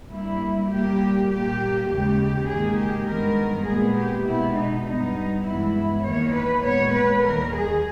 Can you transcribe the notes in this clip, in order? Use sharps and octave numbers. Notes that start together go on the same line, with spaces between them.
G2 G3 A#3 E4
A#2 G3 A#3 G4
A#2 A#3 G4
D#2 C#3 G#3 G4
G#2 D#3 A#3 G#4
G4
G2 D#3 G#3 B3 A#4
A#2 G#3 B3 G#4
G4
B2 G#3 B3 E4
D#4
G2 G3 B3 D#4
G2 E3 G#3 B3 E4
E2 D#3 A#3 C#5
B4
A#2 G#3 B3 C#5
B4
D#2 D#3 G3 A#4
G#4